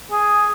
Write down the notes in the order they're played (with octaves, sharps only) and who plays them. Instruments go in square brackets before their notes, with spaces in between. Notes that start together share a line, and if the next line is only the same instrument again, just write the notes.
[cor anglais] G#4